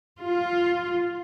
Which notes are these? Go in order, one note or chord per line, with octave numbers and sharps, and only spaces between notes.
F4